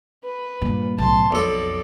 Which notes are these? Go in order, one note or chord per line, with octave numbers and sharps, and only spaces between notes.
B4
G2 A#2
B1 A2 A5 C6
B1 F2 A4 D5